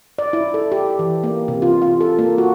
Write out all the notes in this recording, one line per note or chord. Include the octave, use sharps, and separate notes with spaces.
D5
E4
A4
G4
E3
A#3
C3
F4
F4
A4
A#3
F#4